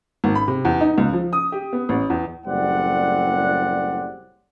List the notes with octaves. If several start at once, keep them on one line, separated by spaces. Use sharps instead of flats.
G#1
B5
C3
E2
D#4
C#2
F3
D#6
G4
B3
A1
E2
F#1 A2 G3 C4 D5 F#5